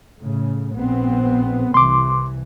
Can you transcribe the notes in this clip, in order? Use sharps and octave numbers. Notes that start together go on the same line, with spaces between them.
A2 C#3
A#1 B3 C4
C2 E3 C6 D6